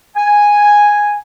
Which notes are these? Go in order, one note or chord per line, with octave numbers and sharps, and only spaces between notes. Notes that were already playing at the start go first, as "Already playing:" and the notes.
G#5